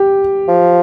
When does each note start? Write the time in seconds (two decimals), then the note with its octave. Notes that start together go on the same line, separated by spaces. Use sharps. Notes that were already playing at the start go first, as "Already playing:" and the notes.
Already playing: G4
0.48 F3